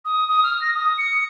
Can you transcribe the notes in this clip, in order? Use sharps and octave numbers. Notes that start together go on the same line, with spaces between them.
D#6
D#6
F6
A#6
D#6
C#7